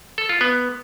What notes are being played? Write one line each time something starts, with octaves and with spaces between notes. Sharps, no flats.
A4
F4
B3